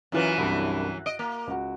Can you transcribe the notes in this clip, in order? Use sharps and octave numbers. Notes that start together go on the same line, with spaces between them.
F#2 E3 F#3 E4 F4 B4
C2 G2
D#5 D7
A#3
C#2 F#4